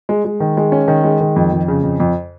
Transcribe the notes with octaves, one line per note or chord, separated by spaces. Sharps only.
G#3
G#3
D#3
G#3
C#4
D#3
G#3
D#3
F2
F2
C#3
F2
F2